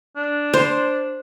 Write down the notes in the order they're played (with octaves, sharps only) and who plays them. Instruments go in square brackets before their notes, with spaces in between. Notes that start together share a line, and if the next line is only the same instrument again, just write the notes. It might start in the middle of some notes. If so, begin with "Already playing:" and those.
[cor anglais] D4
[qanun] C5